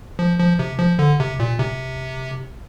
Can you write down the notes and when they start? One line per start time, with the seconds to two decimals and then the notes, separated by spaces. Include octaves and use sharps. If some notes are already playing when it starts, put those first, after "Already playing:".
0.19 F3
0.39 F3
0.59 C3
0.79 F3
0.99 D3
1.20 C3
1.40 A#2
1.60 C3